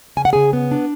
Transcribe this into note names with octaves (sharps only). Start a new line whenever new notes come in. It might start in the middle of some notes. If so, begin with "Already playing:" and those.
C#3 G#5
F#5
C#3 G#4 G#5
B3
D4